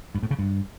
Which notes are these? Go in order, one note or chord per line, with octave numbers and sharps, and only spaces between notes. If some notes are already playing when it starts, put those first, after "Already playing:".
G2
A2
C#3
G2